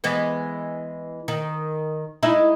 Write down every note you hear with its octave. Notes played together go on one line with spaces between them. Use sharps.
E3 G#3 B3
D#3
G#3 D#4 E4